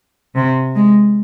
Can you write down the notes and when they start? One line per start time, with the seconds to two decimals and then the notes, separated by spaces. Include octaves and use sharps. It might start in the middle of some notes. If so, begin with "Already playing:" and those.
0.36 C3
0.76 G#3